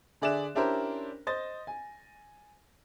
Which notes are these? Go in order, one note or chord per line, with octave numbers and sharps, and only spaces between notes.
D3 G#4 D5 E5 F#6 E7
C#4 D4 E4 G4 A#4 C5
C5 D#5 A6
G#5